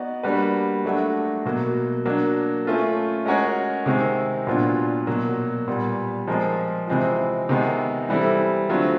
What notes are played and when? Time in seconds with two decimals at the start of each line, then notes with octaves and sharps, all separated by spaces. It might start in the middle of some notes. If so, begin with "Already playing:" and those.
Already playing: B3 D#4 F#4 D5
0.23 G3 A#3 D4 F#4 B4
0.85 F#3 A3 D4 F#4
1.45 B2 F#3 A#3
2.05 F#3 A#3 D4
2.65 A3 C#4 F4 A4
3.25 G#3 C#4 F#4 A#4 C#5
3.86 C3 D#3 G#3 C4
4.47 A#2 F#3 B3 D4 F4
5.07 B2 F#3 A#3
5.67 A#2 G3 B3
6.27 F3 G#3 C4 F4 A#4
6.88 C3 E3 G#3 C4 F4
7.49 C3 D#3 G#3 B3
8.09 E3 G3 C4 E4 A4
8.69 D3 F#3 A3 C4 F4